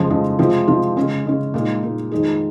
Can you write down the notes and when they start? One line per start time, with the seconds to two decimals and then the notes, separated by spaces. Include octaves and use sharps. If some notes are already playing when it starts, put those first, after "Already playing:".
Already playing: F2 C#3 F3 G#3
0.10 F2 C#3 F3 G#3
0.39 C3 F3 G#3 C4 F4
0.68 C3 F3 G#3 C4 F4
0.96 C#3 G#3 C#4
1.25 C#3 G#3 C#4
1.54 A#2 G#3 D#4
1.83 A#2 G#3 D#4
2.11 F2 D#3 G#3 D#4 G#4